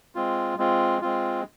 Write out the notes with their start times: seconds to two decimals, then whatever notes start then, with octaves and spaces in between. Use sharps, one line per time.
0.15 G#3 C4 F4
0.58 G#3 C4 F4
1.01 G#3 C4 F4